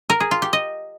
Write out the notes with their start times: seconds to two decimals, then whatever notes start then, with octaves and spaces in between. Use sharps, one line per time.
0.10 A#4
0.20 G#4
0.31 F4
0.42 G4
0.53 D#5